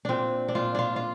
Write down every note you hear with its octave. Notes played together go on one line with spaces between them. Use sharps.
A#2 C4 D4
D4
A#2 F4
D4 F4
F4